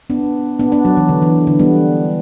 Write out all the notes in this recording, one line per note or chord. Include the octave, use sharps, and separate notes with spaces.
B3 D4
B3 D4
B3 D4
F#3
E3
D3
E3
D3
G3 B3